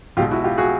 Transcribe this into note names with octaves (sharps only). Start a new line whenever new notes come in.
B1 B2 G#3 F4 G4
E4 F#4
F4 G4
F#4 G#4